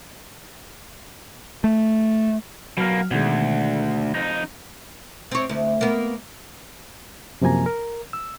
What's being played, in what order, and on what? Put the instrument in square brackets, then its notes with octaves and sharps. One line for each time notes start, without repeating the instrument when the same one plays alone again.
[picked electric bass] A3
[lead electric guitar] B2 A#3 [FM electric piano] F#3 F6
[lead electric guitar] D2 [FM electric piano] B2 D#3 G#3
[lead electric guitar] F2 D#4
[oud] C4 C#5
D2
A#3 B3
[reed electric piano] F#2 C3 F3 A#3 G#5 A#5
A#4
E6